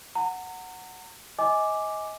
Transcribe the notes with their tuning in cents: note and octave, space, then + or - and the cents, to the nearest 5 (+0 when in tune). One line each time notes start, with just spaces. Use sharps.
F#5 -5 A#5 -30
D#5 +25 G#5 +0 D6 +0